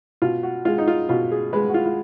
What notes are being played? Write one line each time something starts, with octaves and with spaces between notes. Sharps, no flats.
B2 F4
F#4
G#3 F4
D#4
F4
B2 F4
G#4
G#3 B4
F#4
F4
F4